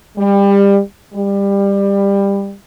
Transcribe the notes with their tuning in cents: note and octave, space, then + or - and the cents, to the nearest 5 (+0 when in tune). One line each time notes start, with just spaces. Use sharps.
G3 +25
G3 +20